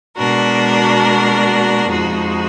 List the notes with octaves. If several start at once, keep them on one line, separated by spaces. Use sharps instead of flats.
B2 G#3 D4 F#4 A#4
F2 F3 G#3 D#4 F#4